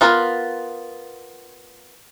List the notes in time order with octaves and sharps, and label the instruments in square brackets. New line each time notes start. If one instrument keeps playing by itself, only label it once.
[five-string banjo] B3 F4 A#4 B4